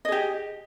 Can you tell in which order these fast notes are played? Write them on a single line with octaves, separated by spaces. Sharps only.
D#5 G#4 G4